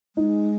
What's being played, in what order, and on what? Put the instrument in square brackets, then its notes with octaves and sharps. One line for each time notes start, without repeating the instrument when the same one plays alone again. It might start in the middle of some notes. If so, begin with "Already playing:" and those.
[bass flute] G#3 [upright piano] D#4